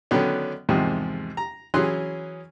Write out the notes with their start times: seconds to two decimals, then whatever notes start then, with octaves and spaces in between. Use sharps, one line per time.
0.11 D3 D#3 F#3 B3 C#4
0.69 E2 G#2 C3 D#3 F3
1.37 A#5
1.74 E3 F#3 C#4 G#4 C6 F#6